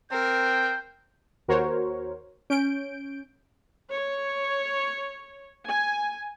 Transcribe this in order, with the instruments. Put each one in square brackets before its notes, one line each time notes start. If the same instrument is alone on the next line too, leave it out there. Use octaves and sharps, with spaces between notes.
[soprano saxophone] C4 [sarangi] A#4 [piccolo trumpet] G6
[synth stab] D#2 F#4 A#4 C5 C#5
C#4 G6 D7
[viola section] C#5
G#5